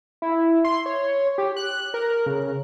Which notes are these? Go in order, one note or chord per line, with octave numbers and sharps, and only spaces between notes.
E4
C6
C#5
G4
F#6
A#4
C#3